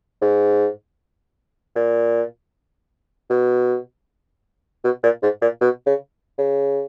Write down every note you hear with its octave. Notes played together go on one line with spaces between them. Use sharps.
G#2
A#2
B2
B2
A#2
G#2
A#2
B2
C#3
C#3